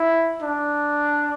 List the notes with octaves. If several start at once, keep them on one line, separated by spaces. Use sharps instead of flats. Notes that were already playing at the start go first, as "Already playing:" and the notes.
Already playing: E4
D4